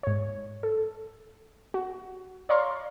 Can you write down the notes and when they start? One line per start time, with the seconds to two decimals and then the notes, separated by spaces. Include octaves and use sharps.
0.03 G#2 C#5
0.63 A4
1.74 F#4
2.49 C#5 D5 F5 A#5 C6 C#6